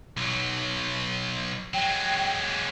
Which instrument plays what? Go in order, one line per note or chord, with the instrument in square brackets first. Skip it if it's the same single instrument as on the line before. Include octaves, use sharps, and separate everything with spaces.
[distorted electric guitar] B1 F#3
[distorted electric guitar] F#3 G#3 [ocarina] G5